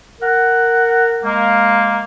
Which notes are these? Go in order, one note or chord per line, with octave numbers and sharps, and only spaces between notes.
A#4 F#5
G#3 A#3